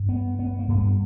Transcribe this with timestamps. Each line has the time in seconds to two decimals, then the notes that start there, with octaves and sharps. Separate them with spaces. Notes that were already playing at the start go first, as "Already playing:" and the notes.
Already playing: G2
0.09 B3
0.39 B3
0.59 A#3
0.68 G2 B3